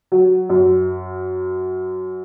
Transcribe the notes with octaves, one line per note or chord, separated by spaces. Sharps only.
F#3
F#2